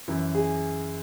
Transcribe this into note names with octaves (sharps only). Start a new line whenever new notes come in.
F#2 E3
G#4